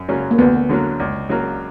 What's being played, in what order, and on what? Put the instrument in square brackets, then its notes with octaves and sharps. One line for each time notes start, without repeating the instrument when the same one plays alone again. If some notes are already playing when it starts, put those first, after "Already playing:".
Already playing: [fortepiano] F#2
C#3 F#3 A#3 C#4
[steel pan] A#3
[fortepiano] D2 [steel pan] B3
[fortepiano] D3 F#3 A#3
C#2
C#3 F#3 A#3